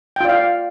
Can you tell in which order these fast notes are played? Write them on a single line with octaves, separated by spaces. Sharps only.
G5 F4 D5 F5